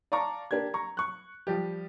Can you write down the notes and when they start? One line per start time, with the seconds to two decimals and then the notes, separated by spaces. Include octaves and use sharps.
0.12 D5 F5 A5 A#5 C#6 D6
0.51 A#3 D4 G4 G#6
0.74 A#5 C#6
0.97 C#6 F#6
1.47 F3 G3 G4